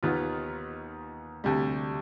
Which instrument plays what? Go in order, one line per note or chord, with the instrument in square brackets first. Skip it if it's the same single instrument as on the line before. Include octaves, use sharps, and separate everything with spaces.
[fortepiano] D#2 D#3 B3 F4
D2 C3 G3